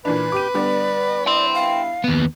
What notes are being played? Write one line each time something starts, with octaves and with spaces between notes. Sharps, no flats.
A#2 E3 D4 B4
G4 D6 D#7
D3 G3 B3 D5
E4 G5 C6
F5
D#2 B3